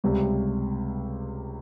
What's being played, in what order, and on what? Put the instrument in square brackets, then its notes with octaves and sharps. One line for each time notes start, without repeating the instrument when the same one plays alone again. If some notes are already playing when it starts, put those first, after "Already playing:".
[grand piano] C#2 C3 G3